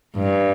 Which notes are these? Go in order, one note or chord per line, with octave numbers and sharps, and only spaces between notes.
G2